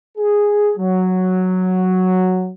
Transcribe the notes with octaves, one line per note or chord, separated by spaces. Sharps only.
G#4
F#3